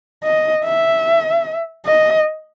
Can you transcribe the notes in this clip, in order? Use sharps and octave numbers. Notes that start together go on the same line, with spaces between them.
D#5
E5
D#5